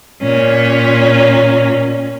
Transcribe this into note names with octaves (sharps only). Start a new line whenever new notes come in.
A#2 C#4